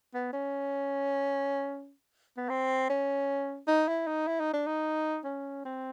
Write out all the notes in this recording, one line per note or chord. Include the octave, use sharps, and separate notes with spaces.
B3
C#4
B3
C4
C#4
D#4
E4
D#4
E4
D#4
D4
D#4
C#4
C4